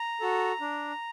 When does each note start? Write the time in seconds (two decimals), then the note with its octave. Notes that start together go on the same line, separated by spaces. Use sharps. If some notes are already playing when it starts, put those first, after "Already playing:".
Already playing: A#5
0.21 F#4 A4
0.61 D4